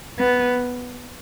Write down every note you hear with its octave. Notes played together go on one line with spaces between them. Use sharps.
B3